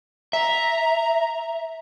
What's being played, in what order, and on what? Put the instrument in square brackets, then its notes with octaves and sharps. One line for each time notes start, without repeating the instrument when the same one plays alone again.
[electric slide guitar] E5 [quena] A#5